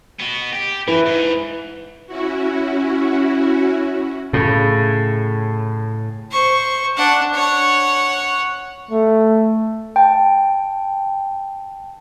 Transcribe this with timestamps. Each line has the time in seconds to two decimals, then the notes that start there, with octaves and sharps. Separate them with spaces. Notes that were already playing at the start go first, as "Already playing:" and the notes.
0.20 B3 F#4
0.52 G4
0.88 E3 E4 B4
1.06 G#2
2.07 C#4 E4 F#4
4.33 A2 C#3
6.31 C5 C#6
6.97 D4 F#5
7.34 C#5 F#5
8.91 A3
9.96 G5 A5